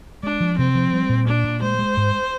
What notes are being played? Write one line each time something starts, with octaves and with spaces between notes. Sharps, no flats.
G#3 D4
F3
C3 C4
F3
G3
A#2
A#2 D4
A#2
G#3 C5
G#3
G#2